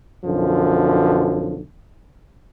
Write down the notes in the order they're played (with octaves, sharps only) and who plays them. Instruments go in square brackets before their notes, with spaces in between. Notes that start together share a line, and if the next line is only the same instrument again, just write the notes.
[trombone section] B1 F#2 D3 F3